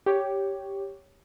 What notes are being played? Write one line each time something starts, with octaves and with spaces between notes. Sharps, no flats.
G4 C#5